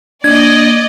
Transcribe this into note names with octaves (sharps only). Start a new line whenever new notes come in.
A#3 D4 D5 D#5 G#6